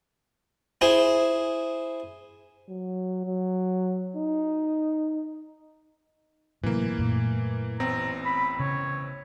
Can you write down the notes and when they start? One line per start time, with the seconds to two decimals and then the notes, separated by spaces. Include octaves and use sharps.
0.81 E4 G#4 C5
2.69 F#3
3.26 F#3
4.16 D#4
6.63 A2 C3 E3 F#3 A#3
6.98 F#2 A#2 A3
7.80 A1 B3 C4 A#5
8.25 B5
8.60 C#3 C#5